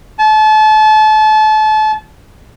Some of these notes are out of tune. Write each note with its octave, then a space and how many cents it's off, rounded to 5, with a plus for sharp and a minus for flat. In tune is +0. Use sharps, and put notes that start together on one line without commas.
A5 -30